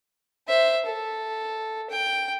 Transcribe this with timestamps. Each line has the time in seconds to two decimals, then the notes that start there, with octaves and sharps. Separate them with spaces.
0.48 C5 E5
0.86 A4
1.90 G5